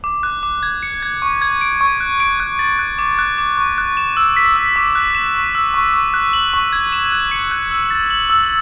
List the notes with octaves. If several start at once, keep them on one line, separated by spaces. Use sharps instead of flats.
D6
F#6
D6
G#6
C#7
G#6
C#6
G#6
D7
C#6
F#6
D7
F#6
A6
F#6
D6
F#6
D6
C#6
F#6
E7
E6
B6
E6
D6
F#6
E7
C#6
E6
C#6
C#6
F#6
F#7
C#6
G#6
E7
F#6
C#7
F#6
E6
A6
F#7
E6